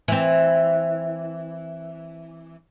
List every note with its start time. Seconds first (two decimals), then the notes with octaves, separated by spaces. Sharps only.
0.08 E3 C4